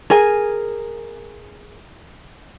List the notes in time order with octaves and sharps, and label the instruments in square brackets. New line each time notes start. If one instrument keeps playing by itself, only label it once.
[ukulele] G#4 A#4 G#5